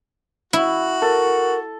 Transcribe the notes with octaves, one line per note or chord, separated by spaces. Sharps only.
E4 F#4
A4 A#4